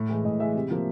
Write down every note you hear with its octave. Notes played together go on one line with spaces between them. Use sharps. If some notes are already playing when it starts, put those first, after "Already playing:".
Already playing: A2
E3 G#3
A2 D#5
E3 G#3 E5
C3
F3 A#3